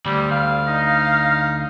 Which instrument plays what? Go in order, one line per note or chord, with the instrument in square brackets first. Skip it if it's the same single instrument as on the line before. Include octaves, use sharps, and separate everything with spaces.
[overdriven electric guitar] D2 [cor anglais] G3
[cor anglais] F5
[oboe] D#4